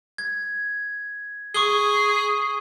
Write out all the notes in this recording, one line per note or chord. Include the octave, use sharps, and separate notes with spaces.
G#6
G#4 C#6 D#6 G7